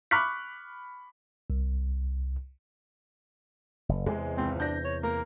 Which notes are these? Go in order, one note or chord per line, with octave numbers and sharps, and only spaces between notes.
B5 C#6 D6 F6 F#6 B6
C2
F#1
E2 C3 G#3
G#1 C#2 C4
D4 G6 A#6
C#5
A#3 A#4